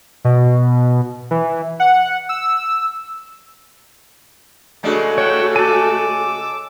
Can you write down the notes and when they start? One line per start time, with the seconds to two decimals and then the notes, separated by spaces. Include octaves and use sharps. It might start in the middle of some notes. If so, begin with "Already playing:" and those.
0.25 B2
1.31 E3
1.80 F#5
2.29 E6
4.83 C#3 G#3 A3 D4 F#4
5.18 E4 C#5 F#5 G5
5.56 G#5 A5 D6 E6